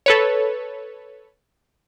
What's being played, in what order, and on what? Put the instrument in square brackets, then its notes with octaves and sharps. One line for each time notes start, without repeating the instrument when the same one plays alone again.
[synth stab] A4 B4 C#5